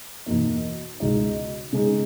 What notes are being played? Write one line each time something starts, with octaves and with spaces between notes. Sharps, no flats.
E2 B2 A#3 D#4
C#2 B2 G#3 D#4
C#3 G#3 D#4 G#4